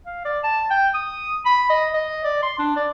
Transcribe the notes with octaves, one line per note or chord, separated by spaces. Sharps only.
F5
D5
A5
G5
D#6
B5
D#5
D#5
D5
C6
D4
D5